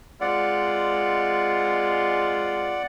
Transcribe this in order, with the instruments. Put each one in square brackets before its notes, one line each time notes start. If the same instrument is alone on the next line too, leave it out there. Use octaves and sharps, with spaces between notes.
[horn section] G#3 C4 F4 [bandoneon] D5 F#5